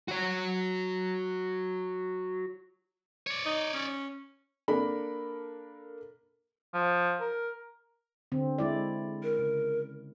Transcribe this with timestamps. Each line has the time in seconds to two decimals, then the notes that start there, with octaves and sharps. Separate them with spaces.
0.08 F#4 C#5
3.27 C#5 D5
3.46 D#4
3.74 C#4
4.68 A#3 D4 A4 A#4 B5
6.74 F3
7.21 A#4
8.32 D3 C4
8.58 G#3 E4 D5
9.23 A#4
9.39 C#3